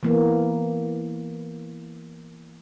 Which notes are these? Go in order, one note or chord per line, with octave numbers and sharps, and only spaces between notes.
E3 A#3 B3